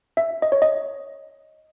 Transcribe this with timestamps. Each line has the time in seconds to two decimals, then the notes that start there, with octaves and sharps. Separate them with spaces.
0.17 E5
0.42 D#5
0.52 C#5
0.62 D#5